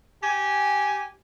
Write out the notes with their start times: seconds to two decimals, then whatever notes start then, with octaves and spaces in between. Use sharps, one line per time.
0.22 G4 G#5